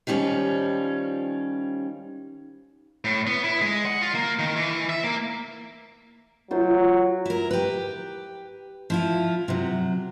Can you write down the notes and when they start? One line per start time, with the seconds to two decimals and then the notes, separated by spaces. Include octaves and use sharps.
0.07 D#3 F3 G3 C#4 F4
3.05 A2
3.27 B3
3.43 E4
3.62 G#3
3.85 F#5
4.01 F4
4.15 A#3
4.39 D#3
4.56 E3
4.89 E5
5.04 A#3
6.51 F#3 F4 C5
7.26 E4 A#4
7.51 G4 B4
8.90 F3 E4 F4
9.48 C3 F#3